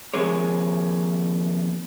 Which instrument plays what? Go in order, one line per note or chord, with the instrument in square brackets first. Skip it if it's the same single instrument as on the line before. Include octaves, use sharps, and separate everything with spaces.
[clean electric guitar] D#2 F3 C4 G#4 A#4 C#5